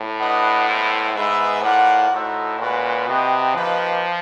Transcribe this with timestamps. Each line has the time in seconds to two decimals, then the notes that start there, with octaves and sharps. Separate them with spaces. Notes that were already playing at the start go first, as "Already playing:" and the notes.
Already playing: A2
0.19 D4 F#4 B4 D#5 F#5
0.67 G#3 B3 E4 A4 C5
1.15 G#2 B3 D#4 G#4 B4 E5
1.63 A2 F4 A#4 D5 F#5
2.11 A2 D#4 F#4 A4 C5 E5
2.59 A#2 G#3 C#4 F#4 B4
3.08 C3 F#4 B4 D#5 G5
3.55 F3 A#3 D#4 G4 B4